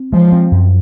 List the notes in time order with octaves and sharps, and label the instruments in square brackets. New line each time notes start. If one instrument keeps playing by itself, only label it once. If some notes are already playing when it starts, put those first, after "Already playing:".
Already playing: [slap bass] C4
[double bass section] F3 [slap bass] G#3
[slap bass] C4
F#2